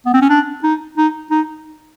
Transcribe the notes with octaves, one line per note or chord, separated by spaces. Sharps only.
B3
C4
C#4
D4
D#4
D#4
D#4